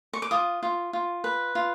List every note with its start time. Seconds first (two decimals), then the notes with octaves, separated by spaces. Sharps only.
0.13 C#6
0.22 D6
0.31 F4 D#6
0.63 F4
0.93 F4
1.24 B4
1.55 F4